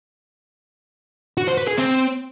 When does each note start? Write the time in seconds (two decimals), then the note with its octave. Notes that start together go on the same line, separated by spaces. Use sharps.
1.37 F#4
1.47 C5
1.57 B4
1.67 G#4
1.77 C4